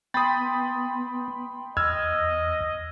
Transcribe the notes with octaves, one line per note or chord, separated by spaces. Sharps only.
B3 G5 B5 C6 D#6 A6
E2 D#5 E6 F6 G#6